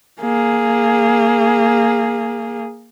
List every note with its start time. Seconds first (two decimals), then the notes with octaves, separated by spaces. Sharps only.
0.21 A#3 G#4